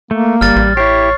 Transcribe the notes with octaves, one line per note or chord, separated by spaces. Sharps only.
A3 A#3
G1 G3 F6 A6
A1
E4 G4 C#5 C7